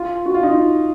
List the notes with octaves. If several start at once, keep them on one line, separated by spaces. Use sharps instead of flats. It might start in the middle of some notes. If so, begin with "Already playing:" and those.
Already playing: F4
F#4
F4
D#4